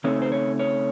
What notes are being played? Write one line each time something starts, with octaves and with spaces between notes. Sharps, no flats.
C#3 A3 C4 D#4 C#5
C5
C#5
C#5